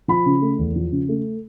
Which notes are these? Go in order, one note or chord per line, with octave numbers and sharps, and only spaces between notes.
F3 B5
C#3
A3
E2
F3
C#3
A3